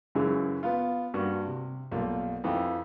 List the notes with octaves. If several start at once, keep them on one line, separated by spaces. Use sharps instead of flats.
F#2 C#3 E3 G#3
B3 F4
G2 A#3 F#4
C3
B1 G3 A#3 F4
F2 E3 F4 G5